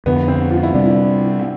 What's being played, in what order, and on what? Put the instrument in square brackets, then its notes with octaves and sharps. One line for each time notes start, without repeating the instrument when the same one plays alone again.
[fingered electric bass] F2 D3 F3 [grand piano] B3
[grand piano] C4
F4
E4
[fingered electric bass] C3 G3 C4 [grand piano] D4
[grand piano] E4